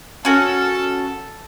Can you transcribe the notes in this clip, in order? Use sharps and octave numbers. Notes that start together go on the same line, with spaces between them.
C#4 F#4 A4